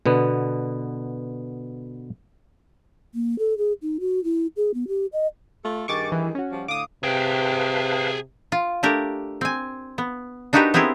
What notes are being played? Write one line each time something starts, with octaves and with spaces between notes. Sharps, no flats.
B2 D3 B3
A#3
A4
G#4
D#4
F#4
E4
G#4
B3
G4
D#5
A3 F4 A4
G2 D#3 G#4 C#6 D6 A6
E3
C#4 F#4
F3 G3
A2 D3 F5 D6 D#6
C3 G#4 B4 F5 G5 A5
F4
A3 D4 G4 A#4
C4 G#5
B3
D4 D#4 F#4 G4 A#4 B4
B3 C4 E4 G4 G#4 A#4